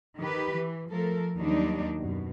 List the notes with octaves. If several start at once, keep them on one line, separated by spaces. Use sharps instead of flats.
D#3 G4 B4
E3
F3 A3 A4 A#4
D#2 D#3 F#3 G3 D4 D#4
F#2 B2